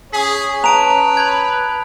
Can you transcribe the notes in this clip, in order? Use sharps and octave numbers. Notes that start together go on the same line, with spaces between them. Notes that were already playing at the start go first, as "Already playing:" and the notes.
C#4 G#4 D#6 B6
B4 A5 A#5 D7 F7
B5 G6 G#6